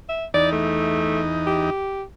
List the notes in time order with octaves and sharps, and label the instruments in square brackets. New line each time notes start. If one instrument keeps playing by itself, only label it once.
[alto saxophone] E5
[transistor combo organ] E2 D#4 [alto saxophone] D5
[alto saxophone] A3
G4